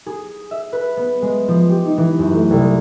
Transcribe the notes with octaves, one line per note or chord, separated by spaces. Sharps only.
G#4
E5
B4
B3
G#3
F3
G4
D#4
E3
F#2
A3
C2